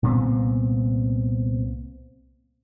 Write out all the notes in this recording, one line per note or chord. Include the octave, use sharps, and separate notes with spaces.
C2 A#2 B3 C4